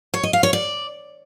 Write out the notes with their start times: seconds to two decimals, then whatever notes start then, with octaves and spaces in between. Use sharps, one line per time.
0.14 C#5
0.23 D#5
0.33 F5
0.43 C#5
0.53 D5